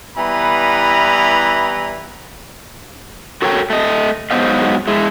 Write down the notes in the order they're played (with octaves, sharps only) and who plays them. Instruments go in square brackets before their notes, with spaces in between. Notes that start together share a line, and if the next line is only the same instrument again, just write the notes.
[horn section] E3 G3 B3 E4 B4 A#5
[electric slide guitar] F#4 A4 A#4 C#5 F#5 G5
A3 D#5
G#2 F#3 B3 C5 D#5 F5
G#3 E4